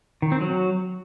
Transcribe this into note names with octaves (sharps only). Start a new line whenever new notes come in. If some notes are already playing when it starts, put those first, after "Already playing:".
D#3
C4
F#3